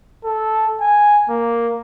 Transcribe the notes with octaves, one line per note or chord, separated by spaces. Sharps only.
A4
G#5
A#3